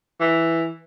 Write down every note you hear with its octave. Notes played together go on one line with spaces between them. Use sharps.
E3